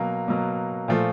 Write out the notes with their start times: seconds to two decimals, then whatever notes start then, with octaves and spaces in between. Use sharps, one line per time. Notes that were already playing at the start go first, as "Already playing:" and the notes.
Already playing: B2 F#3 A#3
0.28 B2 F#3 A#3
0.88 A#2 F3 A3